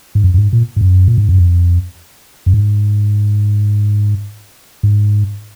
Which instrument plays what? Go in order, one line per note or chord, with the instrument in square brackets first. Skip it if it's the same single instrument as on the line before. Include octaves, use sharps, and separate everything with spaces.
[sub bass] G#2
F#2
F#2
G#2
A#2
G#2
F#2
A#2
G#2
F#2
F2
F#2
G#2
G#2